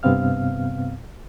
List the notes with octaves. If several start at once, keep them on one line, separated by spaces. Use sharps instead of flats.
G2 C3 B3 C4 F5 F6